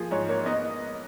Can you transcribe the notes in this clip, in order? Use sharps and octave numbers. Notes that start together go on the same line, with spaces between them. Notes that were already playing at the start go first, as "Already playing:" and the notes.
Already playing: F3 A#3 G#4
G#2 C#5
A#3 C#5
B3 D#5